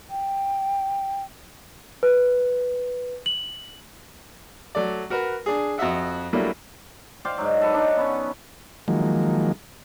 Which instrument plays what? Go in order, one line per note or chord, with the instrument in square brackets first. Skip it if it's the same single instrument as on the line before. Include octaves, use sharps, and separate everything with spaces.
[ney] G5
[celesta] B4
F#7
[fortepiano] F#3 A3 D5
F#4 A#4 B4
D4 G#4
F2 F#4 D#5 E5 F#5
F#3 G3 A3 A#3 D4 E4
[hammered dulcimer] C5 D5 F5 G5
G#2 F#3
A4 B4
D4 D#4
B3 C#4
[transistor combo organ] D#3 F3 F#3 G#3 A#3